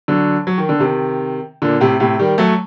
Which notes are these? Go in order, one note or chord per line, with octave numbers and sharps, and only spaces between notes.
D3 F#3
F#3
D#3
D3
C3 D#3
A#2 D3
A2 C3
A2 C3
D#3 G3
F#3 A3